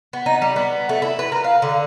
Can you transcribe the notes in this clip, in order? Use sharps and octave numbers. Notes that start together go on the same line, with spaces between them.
B3
D#4
G3
B3
A3
E4
B4
A#4
F5
D3